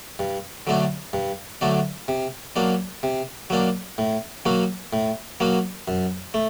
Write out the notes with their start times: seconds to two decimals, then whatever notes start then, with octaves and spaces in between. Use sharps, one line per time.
0.19 G2
0.67 D3 F#3 A3 D4
1.13 G2
1.61 D3 F#3 A3 D4
2.08 C3
2.56 F#3 A#3 D4
3.03 C3
3.50 F#3 A#3 D4
3.98 A2
4.45 F#3 A#3 F#4
4.93 A2
5.40 F#3 A#3 F#4
5.88 F#2
6.34 A3